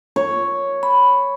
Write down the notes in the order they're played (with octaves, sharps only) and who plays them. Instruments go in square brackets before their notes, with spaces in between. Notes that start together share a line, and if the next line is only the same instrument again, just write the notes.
[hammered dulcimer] C#5
[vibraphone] B5